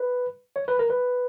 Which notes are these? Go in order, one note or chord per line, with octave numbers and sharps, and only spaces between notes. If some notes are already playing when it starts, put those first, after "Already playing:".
Already playing: B4
C#5
B4
A#4
B4